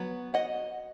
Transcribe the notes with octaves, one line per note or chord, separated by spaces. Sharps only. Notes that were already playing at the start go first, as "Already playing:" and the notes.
Already playing: F#3 B3
D#5 F#5